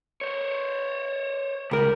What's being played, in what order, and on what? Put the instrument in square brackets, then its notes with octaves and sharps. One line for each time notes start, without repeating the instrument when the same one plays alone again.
[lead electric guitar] C5 C#5
[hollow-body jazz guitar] C#2 A#4 [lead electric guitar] G3